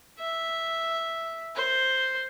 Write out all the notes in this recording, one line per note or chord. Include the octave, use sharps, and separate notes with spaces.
E5
C5